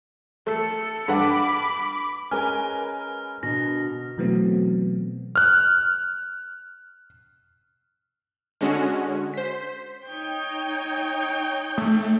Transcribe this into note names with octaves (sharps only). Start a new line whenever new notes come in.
A3 A4 C#7
G2 A4 F#5 B5 D6
G#3 C#4 A#4 B4 G#5 F6
B2 D3 A#6
B2 E3 F#3 A3 B3 C4
F6 F#6
D3 G#3 C#4 F#4
C5 B6
D#4 C#5 G5
A3